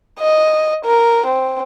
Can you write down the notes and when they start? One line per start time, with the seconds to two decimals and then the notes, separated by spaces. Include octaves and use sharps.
0.19 D#5
0.85 A#4
1.27 C4